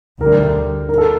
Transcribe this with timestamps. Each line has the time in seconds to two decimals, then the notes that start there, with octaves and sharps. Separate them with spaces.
0.21 D2 D3 G3 A#4
0.89 A#4
0.98 A4